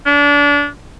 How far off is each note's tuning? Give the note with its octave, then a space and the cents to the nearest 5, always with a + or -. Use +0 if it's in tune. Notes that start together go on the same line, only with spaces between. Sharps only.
D4 -30